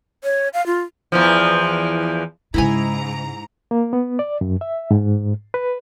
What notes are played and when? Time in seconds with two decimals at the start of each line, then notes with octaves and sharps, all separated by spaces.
0.24 C#5
0.54 F5
0.66 F4
1.12 E2 E3 F3
2.54 G#2 C#3 G#3 E4 D#5 G#5 A#5
3.71 A#3
3.93 B3
4.19 D5
4.41 F#2
4.61 E5
4.91 G#2
5.54 B4